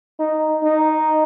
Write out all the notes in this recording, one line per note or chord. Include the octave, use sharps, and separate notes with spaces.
D#4
D#4